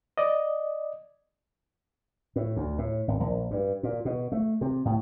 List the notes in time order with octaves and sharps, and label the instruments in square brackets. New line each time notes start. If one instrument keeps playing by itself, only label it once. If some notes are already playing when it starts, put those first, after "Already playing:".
[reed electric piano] D5 D#5
[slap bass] A2
D2
A2
G#1
A#1
G2
A#2
B2
A3
C3
A2